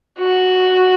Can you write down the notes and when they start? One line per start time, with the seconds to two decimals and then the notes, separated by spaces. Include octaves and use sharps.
0.19 F#4